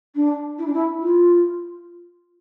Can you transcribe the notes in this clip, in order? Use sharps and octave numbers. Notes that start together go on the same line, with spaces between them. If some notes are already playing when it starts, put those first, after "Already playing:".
D4
E4
D4
E4
F4